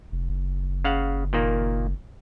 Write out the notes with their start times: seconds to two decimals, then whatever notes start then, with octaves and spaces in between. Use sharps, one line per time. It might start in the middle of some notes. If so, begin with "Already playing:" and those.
0.12 F1
0.29 F#1
0.84 C#3 F5 F#5
1.33 A#2 D#3 A#3